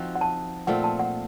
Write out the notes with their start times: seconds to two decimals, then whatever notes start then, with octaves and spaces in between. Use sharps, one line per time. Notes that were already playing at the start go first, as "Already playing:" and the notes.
Already playing: F3 C4 D#4 F#4
0.15 F#5
0.21 A5
0.67 A#2 A3 C4 F4 F#5
0.84 A5
0.99 F#5